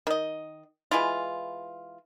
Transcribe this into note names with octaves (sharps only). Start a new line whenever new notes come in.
D#3 D#5
E3 G#3 E4 F4